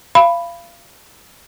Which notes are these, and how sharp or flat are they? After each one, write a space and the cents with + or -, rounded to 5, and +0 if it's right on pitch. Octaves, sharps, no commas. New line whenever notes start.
F5 -30 B5 +0